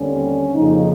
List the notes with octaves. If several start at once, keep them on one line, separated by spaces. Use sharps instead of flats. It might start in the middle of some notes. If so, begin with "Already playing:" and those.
Already playing: D#2 D3 G3 C4 C#4
F2 C#3 F3 A#3 D#4